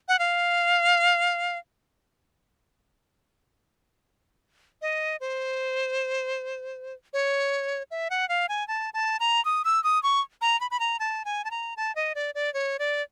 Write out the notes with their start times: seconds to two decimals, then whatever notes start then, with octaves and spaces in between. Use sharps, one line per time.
0.08 F#5
0.19 F5
4.82 D#5
5.21 C5
7.13 C#5
7.91 E5
8.10 F#5
8.29 F5
8.49 G#5
8.68 A5
8.94 A5
9.20 A#5
9.45 D#6
9.65 E6
9.84 D#6
10.03 C#6
10.41 A#5
10.61 B5
10.71 B5
10.80 A#5
11.00 A5
11.25 G#5
11.45 A5
11.51 A#5
11.77 A5
11.95 D#5
12.15 D5
12.35 D5
12.54 C#5
12.79 D5